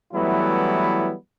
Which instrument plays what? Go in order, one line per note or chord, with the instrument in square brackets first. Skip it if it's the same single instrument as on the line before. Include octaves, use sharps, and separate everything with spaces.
[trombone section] E3 F#3 G3 A3 B3 E4